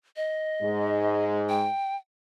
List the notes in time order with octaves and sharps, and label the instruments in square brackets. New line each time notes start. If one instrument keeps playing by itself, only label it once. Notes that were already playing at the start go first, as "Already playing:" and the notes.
[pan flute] D#5
[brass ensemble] G#2 G#3
[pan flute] G5